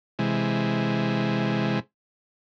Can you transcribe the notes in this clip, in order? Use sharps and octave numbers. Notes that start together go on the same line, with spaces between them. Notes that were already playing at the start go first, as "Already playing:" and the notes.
C3 E3 G#3